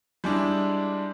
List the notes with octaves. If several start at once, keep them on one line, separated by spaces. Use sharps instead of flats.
G3 G#3 D4 E4